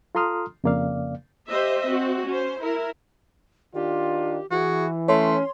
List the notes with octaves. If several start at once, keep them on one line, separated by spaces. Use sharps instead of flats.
F4 A4 A#5 C6 D#6 F6
F2 C#3 A#3 D5 F5
G4 C5 D#5 E5
C4 F#4
C#4 C5
E4 A#4
D#3 D4 F4 G4
E3 F#4 G#4
A3 C#4 C#5 C6